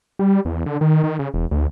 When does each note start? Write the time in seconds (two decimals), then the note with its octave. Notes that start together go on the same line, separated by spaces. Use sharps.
0.19 G3
0.45 E2
0.66 D3
0.81 D#3
1.04 D#3
1.19 C#3
1.34 E1
1.51 D2